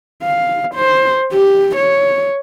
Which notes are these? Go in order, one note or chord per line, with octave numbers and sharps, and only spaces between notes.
F5
C5
G4
C#5